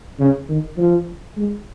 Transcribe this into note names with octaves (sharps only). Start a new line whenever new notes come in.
C#3
D#3
F3
G#3